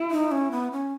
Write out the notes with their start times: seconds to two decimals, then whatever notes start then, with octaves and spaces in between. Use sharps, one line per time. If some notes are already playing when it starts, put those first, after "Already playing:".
Already playing: E4
0.11 D#4
0.32 C#4
0.51 B3
0.72 C#4